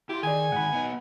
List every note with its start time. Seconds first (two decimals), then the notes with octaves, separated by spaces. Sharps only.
0.09 E4 G4 C6
0.23 D#3 G#4 D5 G#5
0.52 G#2 D#3 F#5 B5
0.73 B3 D#4